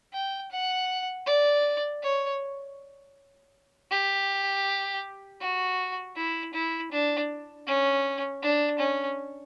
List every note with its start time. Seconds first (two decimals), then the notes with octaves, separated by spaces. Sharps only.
0.14 G5
0.51 F#5
1.26 D5
2.03 C#5
3.90 G4
5.41 F#4
6.16 E4
6.54 E4
6.92 D4
7.67 C#4
8.42 D4
8.79 C#4